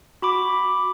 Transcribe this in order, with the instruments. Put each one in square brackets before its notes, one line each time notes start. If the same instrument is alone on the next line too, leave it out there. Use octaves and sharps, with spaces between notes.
[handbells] F#4 B5 D6